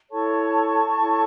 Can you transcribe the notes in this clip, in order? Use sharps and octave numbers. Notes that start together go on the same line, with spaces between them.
E4 A4 C#5 A5 C#6
E4 A4 C#5